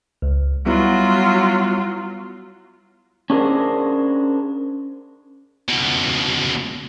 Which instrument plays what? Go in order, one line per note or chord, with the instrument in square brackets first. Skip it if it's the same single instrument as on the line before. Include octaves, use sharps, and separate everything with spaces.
[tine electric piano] C#2
[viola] F#3 F4 [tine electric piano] G3 B3 E4
[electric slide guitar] C#4 D4 G#4 A#4 C5
[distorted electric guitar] C#2 B2